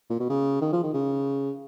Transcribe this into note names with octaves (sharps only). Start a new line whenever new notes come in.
A#2
B2
C#3
D#3
F3
D#3
C#3